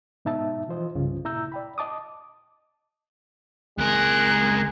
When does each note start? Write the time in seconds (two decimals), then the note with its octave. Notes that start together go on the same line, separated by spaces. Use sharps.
0.25 G#2 B2 D#4 E5 A5
0.68 E3 F3 F4 C5 D#5
0.95 C2 G2 C#3 F4
1.25 A#2 E4 A#5 E6 G6
1.52 D5 G5 B5
1.78 D#5 A5 D6 D#6
3.78 C#2 G#3 A#4 F#6